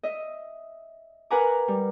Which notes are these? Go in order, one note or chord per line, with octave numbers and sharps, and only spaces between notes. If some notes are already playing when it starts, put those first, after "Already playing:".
D#5 E5
A#4 B4 F#5 G#5 A#5 D6
G3